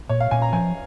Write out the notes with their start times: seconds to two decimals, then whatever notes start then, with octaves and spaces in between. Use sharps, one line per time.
0.09 A#2 C#5
0.20 F5
0.31 A#2 G#5
0.42 A#5
0.53 F3 G#5